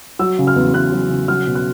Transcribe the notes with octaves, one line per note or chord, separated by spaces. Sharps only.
F#3 E6
C#3
F6
E2
E2 F#6
F#3
C#3
F#3 F6
B2
F#6